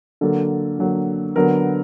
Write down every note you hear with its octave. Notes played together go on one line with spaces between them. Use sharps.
D3 F#3 A#3 A4
D3 F#3 A#3
D3 F#3 B3 A#4